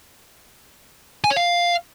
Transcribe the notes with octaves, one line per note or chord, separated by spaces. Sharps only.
G#5
C#5
F5